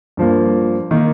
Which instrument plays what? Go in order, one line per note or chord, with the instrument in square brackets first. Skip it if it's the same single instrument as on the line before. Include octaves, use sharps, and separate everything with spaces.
[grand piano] G2 F3 A#3
D#3 A#3